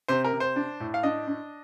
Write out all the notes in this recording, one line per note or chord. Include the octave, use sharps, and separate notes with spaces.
C3 C5
A#4
C3
C5
D4
A2
F5
D4 D#5
D4